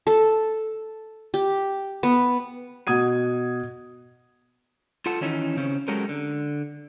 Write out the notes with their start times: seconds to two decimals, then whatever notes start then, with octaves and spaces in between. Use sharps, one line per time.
0.07 A4
1.34 G4
2.03 B3
2.87 B2 F#5 D#6 G#6 D#7
5.06 F4 A4 F#5 A5
5.21 D#3 E3 C#4 D#4 E4
5.56 C#3 C4 C#4
5.88 F#3 G#3 C#4 G4 A4 A#4
6.09 D3